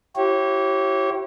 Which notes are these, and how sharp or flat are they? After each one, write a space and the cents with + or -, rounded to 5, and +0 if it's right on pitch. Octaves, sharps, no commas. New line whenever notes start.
E4 +20 G4 -30 C#5 -30